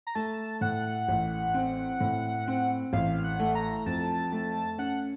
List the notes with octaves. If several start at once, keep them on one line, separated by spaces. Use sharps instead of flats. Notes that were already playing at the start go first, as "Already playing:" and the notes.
A#5
A3 A5
A2 F#5
A1
C4
A2
C4
A1 F5
F#5
A3
A#5
F2 A5
A3
C#4 F#5